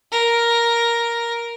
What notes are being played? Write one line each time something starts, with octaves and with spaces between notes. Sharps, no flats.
A#4